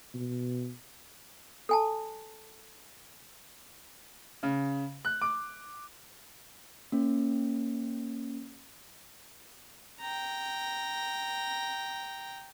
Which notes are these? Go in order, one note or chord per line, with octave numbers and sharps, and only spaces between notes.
B2
A4 G#5 A5
C#3
F#6
D6
A#3 C#4
G5 A#5